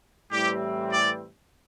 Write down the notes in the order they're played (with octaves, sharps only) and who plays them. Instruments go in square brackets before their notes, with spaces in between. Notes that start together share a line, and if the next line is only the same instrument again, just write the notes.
[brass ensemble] A2 E3 G3 C4 [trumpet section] G4
[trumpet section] D5